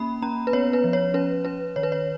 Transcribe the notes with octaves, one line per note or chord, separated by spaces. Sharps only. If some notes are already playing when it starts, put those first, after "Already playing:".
Already playing: A#3 C#4 B5
C#4 A#5
B4
B3 C#5
B4
F3
C#5
C#4 B4
C#4 B4
D#3 C#5
B4
C#5